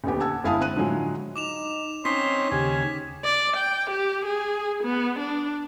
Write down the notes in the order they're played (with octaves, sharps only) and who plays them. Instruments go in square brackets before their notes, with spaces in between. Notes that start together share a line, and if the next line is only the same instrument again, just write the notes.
[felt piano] D#1 D2 B3 G4
F#5 A5 E6 G#6
G1 G#3 E4 F5 A5 D#6
C4 F#6 D#7
A2 D3 F3 F#3 G#3
[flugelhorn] D#4 [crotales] D6 E7 F7
[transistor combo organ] C4 C#4 D#4 [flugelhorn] C#5 [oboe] C6 [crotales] B6
[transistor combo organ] D#2 C#3 [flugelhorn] G4 [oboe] G#5
[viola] D5
G5
G4
G#4
B3
D4